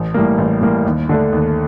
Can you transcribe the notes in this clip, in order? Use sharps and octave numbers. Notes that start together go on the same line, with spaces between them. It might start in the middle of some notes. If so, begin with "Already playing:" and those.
Already playing: A1
A2 G3 A#3
A1
A2 G3 A#3
D#2
D3 A3 D4
D#2